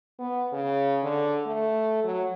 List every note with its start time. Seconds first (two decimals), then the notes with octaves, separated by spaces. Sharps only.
0.19 B3
0.52 C#3
1.03 D3
1.46 A3
2.04 F#3